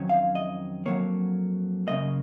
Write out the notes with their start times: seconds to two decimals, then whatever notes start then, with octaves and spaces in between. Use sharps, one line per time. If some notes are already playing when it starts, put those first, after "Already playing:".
Already playing: F2 D#3 F#3 C#4
0.09 F5
0.35 D#5
0.86 F2 C#3 F#3 A#3 C#5
1.87 F#2 C#3 F#3 A#3 D#5